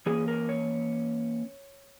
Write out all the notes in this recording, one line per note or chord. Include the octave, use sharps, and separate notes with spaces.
E3 A#3 C#4 G#4
A#4
C#5